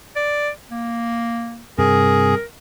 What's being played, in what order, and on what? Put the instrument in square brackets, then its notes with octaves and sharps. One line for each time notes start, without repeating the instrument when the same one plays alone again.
[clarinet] D5
A#3
[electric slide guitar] G2 C3 [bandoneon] G#4 [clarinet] A#4